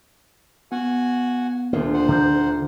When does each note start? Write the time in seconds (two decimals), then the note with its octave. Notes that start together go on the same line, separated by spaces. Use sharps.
0.72 B3 F#4 F#5 G#5
1.73 D#1 D2 A#3 F4
1.94 C5 F#5
2.08 D3 E3 A#5 G6